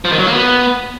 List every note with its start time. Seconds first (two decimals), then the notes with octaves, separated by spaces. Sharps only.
0.05 F3
0.12 D#3
0.19 F#3
0.27 A#3
0.34 B3